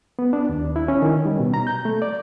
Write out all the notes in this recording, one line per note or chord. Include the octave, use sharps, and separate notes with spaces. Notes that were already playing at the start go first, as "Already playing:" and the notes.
B3
D4
D#2
E4
C#4
D#3
G3
B2
A#5
G6
A3
D5